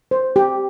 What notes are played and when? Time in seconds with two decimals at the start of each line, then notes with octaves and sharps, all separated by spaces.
0.11 C5
0.36 G4